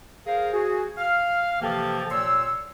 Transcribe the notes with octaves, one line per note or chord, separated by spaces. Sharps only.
G#4 A#4 C5 F5
F#4 G#4
F5 F6
C3 E3 F3 A#3 G4 A4
A#2 C#5 C6 E6